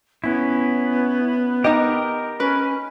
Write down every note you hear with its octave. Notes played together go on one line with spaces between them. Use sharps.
B3 C#4 E4
D#4 G4 A#4 D#5
C#4 B4